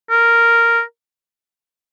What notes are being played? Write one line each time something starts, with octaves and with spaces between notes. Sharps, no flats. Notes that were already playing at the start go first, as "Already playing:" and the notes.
A#4